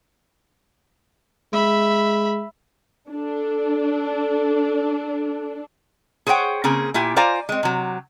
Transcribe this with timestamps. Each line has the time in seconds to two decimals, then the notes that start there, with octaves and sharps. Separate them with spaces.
1.53 G#3 E5 B5
3.09 D4 A4
6.27 G#4 C5 C#5 F#5 G5
6.64 C#3 A#3 C4 G#4
6.94 A#2 E4 G4 G#5
7.16 F4 C5 D5 F5 G#5 A#5
7.49 G#3 C4
7.63 C3 F#3